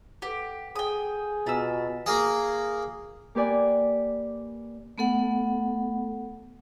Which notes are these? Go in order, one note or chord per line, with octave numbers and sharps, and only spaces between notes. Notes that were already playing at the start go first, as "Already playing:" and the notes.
G4 A4 B4 F#5
G#4 G5 D#6
B2 F4 G#5 A#5 E6 B6
A#3 G#4
A#3 G4 B4 D5 G#5
A3 B3 A4 F#5